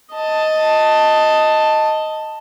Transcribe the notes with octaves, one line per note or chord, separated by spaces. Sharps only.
D#5 A5